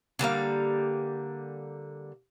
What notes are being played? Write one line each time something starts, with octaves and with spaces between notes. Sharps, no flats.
D3 G3 A#3 F5